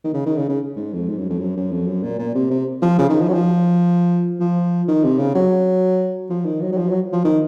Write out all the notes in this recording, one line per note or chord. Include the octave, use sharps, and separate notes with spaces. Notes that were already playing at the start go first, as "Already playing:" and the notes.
D#3
C#3
D#3
C#3
C#3
G#2
F2
G#2
F#2
F2
F#2
F#2
F2
F#2
A#2
A#2
C3
C3
F3
C#3
D#3
F3
F#3
F3
F3
D#3
C3
C#3
F#3
F3
D#3
F#3
F#3
F3
F#3
F3
D#3